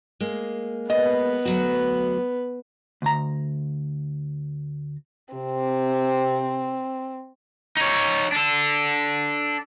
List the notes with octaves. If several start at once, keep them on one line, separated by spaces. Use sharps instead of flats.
G#3 A#3
B3 B4 D#5
D2 F#3 F#4
D2 A#5
C3 C4
D#4 C#5
D4 A4